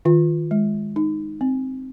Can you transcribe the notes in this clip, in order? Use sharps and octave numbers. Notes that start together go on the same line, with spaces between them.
D#3 F4
G#3
D#4
C4